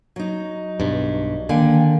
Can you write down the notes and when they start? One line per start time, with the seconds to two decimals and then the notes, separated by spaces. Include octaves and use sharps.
0.16 F#3 D#4
0.80 B1 G2
1.49 D3 D#3 A#3 G5 G#5